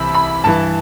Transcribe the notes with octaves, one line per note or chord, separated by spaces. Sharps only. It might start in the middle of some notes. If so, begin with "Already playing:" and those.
Already playing: C2 C3 E3 E5 B5
B5
G2 E3 A5